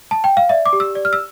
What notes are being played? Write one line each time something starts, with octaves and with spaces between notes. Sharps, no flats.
A5
G5
F5
D5 E5
D6
G4
E6
D5
F6
E6